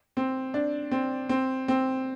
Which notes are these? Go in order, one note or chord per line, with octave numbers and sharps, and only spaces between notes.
C4
D4
C4
C4
C4